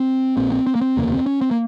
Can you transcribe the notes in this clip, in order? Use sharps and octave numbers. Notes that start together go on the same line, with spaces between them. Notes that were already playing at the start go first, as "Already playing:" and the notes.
Already playing: C4
A#1 A#2 C4
C4
C4
A#3
C4
F1 D#2 C#3 A#3
C4
C#4
C4
A#3